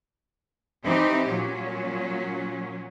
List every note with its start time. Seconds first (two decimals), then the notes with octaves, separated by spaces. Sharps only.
0.83 E3 C4 D#4 G4
1.27 A#2 F#3 C#4